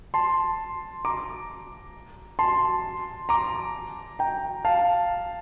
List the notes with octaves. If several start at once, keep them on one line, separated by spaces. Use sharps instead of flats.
A5 C6
A#5 D6
A5 C6
A#5 D6
G5 A#5
F5 A5